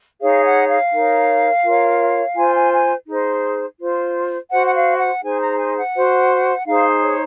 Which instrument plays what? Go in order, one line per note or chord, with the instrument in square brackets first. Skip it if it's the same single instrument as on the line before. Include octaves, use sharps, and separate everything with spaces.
[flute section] D#4 G#4 C#5 F5
F#5
F5
D#4 A#4 C#5
F4 A#4 C#5
F4 C5 G#5
G#5
G#5
D#4 G#4 C5
F4 C5
F#4 C5 F#5
F#5
F5
F#5
D#4 G#4 C5 G#5
A#5
G#5
F#5
F#4 C5
D#4 G#4 C5 F5
C#5